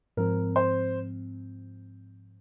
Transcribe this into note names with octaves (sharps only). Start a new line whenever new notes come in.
G#2 F3 C4 A#4
C5